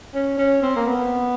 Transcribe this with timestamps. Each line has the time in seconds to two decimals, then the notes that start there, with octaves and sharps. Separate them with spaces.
0.14 C#4
0.38 C#4
0.63 C4
0.76 A#3
0.86 B3